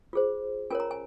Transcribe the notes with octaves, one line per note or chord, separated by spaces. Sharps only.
F4 G#4 C5
C#4 F4 A#4 C#5 G#5
A#5
G#5